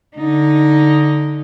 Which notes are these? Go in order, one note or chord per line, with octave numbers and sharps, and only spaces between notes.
D3 D#4